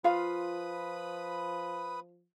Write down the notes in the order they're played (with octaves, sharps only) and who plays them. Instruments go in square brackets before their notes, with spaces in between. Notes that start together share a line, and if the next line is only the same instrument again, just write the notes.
[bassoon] F3 [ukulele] F4 F5 [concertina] B4 B5 D#6